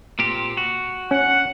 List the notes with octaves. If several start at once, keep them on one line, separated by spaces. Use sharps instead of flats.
A#2 C4 G4
F#4
C#4 F#5